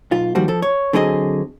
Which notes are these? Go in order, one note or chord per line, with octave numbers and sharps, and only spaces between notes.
B1 F4
D#2 F3 G3 F#4
F3 A4
C#5
D3 F#3 C4 G#4 A#4 D#5